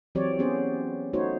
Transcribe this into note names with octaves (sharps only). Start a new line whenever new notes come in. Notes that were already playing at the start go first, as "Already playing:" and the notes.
E3 F#3 C4 G4 C#5 D5
B3 C#4 G#4 C5
A3 D#4 F#4 C5 C#5